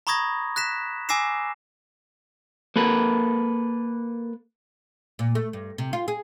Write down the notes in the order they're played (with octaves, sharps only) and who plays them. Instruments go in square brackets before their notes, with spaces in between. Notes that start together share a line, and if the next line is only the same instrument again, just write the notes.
[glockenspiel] A#5 B5 C#6 D#6 G#6 A#6
F#6 A#6 B6 E7
G#5 D6 E6 A#6 C7 E7
[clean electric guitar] A#3 A4 B4
[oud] A#2
A3
G2
C3
F4
G#4